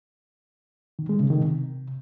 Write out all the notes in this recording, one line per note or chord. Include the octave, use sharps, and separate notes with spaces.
D#3
G#3
C#3
D#3
C3